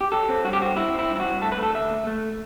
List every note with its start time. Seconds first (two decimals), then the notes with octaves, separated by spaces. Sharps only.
0.01 G4
0.12 F#3 A4
0.29 C4
0.45 G2 F#4
0.53 G4
0.60 C4 F#4
0.76 C4 E4
0.94 C4
0.99 E4
1.10 G2
1.16 E4
1.20 F#4
1.25 G2
1.42 A3 A4
1.52 B4
1.58 A3
1.63 A4
1.75 D2 E5
1.91 A3
2.07 A3